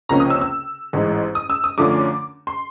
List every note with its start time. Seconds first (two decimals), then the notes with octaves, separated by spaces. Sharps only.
0.09 C#2 C3 F3 A#3 C#4 A#5
0.20 D#6
0.30 E6
0.41 E6
0.93 A1 G#2 E3 G#3
1.35 D#6
1.50 E6
1.64 D#6
1.78 F#2 D3 F3 A3 C#4 D6
2.47 C6